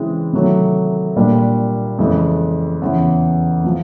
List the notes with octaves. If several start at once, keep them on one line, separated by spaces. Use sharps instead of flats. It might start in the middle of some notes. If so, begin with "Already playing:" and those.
Already playing: C#3 E3 G#3 C4 E4
C3 D#3 F#3 A3
A#2 G3 A#3 D4
F2 C#3 E3 G#3
E2 C#3 E3
C3 F3